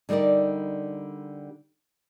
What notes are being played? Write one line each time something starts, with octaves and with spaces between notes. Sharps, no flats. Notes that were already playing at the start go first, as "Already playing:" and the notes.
D3 G3 D#4 A#4 D5